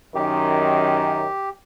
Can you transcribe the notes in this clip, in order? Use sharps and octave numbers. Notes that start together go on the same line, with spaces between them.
F#2 D#3 G4